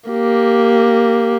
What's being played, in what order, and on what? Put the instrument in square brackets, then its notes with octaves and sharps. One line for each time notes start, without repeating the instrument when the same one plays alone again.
[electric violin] A#3 G4